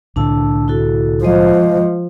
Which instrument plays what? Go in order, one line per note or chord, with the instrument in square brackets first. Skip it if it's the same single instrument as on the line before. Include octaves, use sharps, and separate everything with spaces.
[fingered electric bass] C2 A2 D3 [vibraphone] D4 A5 E6
[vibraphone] E4 F#4 A4
[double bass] F3 [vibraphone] G#3 C5 D#5